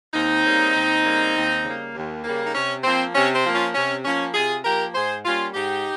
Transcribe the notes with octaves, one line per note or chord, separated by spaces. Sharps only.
D#2 C4 D#4
C#3 G3 A#3
D#2
C#3 G3 A#3
D#2
C#3 G3 A#3
D#2
C#3 G3 A#3
D#4
C3 C#4
F3 A#3 C4
C3 C#4
C4
F3 A#3
C#4 F4
C3 C#4
F3 A#3 C#4
C3 F4 G#4
F3 A#3 G4 A#4
G#2 G#4 C5
G3 A#3 C#4 F4
G#2 D#4 G4